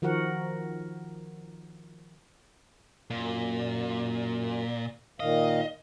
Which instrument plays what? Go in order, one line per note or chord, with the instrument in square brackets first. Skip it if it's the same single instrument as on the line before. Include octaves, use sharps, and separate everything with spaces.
[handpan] D#3 F3 F#4 A#4 F#5
[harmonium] F#2 [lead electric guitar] A#2
[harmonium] A#2 D#3 F5 [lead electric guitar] D#5